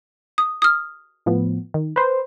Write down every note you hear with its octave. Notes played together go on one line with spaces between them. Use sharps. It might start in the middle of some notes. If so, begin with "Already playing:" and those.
D#6
D#6 F6
A2 F3 B3
D#3
B4 C5